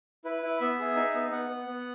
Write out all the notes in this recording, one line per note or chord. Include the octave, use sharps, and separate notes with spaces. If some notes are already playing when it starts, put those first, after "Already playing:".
E4 B4
E4
B3 E5
G#4
D#4
B3
B3 F#5
B3
B3